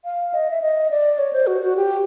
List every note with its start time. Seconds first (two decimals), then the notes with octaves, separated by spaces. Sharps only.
0.05 F5
0.34 D#5
0.50 E5
0.62 D#5
0.91 D5
1.18 C#5
1.33 C5
1.47 F#4
1.61 F#4
1.77 G4